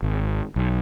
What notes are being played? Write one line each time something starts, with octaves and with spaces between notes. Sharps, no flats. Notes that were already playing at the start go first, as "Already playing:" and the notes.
G#1
B1